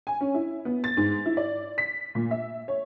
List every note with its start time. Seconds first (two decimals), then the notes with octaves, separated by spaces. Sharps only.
0.07 G#5
0.21 C#4
0.34 E4
0.65 B3
0.84 A6
0.97 G#2
1.26 E4
1.37 D5
1.78 B6
2.15 A#2
2.31 E5
2.68 C#5